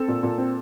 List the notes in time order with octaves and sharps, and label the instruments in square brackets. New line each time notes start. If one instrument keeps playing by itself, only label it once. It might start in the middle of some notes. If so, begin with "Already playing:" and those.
Already playing: [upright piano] C4 A4
A#2
A#2
C4